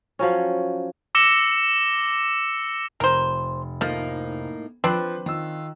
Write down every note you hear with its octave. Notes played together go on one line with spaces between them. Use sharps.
F3 F#3 C#4
D6 E6 A#6 C#7 E7 G7
F1 A#4 C5
A2 F3 A#3 D#4
F3 C4 D4 B4 C5 F#6
D#3 F4 E6